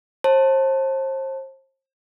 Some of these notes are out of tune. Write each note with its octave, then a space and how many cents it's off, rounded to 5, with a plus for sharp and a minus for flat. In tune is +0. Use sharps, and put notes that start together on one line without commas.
C5 +35 A5 +10